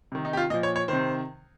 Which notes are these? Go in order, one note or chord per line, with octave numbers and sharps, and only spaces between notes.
C3 D#3
D#4
G4
F4
A#2 F3 D#5
C#5
C#5
C3 D#3 C5